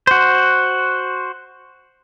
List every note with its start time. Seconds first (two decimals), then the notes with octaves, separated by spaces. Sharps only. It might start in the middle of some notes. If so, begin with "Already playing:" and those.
0.07 F#4 C5